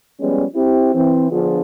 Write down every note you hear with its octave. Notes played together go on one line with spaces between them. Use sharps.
F3 G3 G#3 B3 C#4
C4 E4 G4
E3 C4
D3 F3 B3 D4 F4 G#4